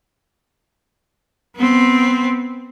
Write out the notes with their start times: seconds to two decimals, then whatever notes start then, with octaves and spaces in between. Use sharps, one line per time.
1.56 B3 C4